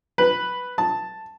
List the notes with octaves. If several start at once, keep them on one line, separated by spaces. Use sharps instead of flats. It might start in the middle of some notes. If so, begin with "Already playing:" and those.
B4
A5